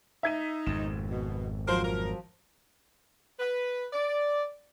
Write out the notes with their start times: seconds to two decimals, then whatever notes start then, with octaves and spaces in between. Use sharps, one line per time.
0.23 D#4 E5 G#6 D#7
0.67 G#1 F2 E7
1.10 B2
1.68 F3 F#3 A#4 C5
1.84 A#4
3.40 B4
3.93 D5